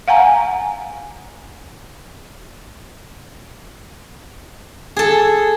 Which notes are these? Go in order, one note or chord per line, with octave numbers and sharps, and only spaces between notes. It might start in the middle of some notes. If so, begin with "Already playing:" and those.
F5 F#5 G#5 A#5
G#4 A4